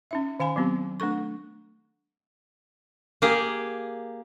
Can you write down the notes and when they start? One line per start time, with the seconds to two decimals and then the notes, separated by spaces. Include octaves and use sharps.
0.11 C#4 D#4 E5
0.40 D#3 F5 G#5 B5
0.56 F#3 B3 C4 G4
1.00 A3 D4 A4 C#6
3.22 A#3 G4 G#4